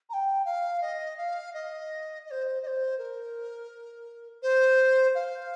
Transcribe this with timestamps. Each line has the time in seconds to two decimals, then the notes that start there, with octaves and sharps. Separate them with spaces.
0.09 A#5
0.13 G5
0.45 F5
0.81 D#5
1.17 F5
1.54 D#5
2.26 D#5
2.31 C5
2.62 D#5
2.67 C5
2.98 A#4
4.42 C5
5.15 F5